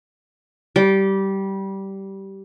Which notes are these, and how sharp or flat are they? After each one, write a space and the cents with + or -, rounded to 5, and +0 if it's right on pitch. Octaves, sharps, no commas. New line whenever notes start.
G3 -15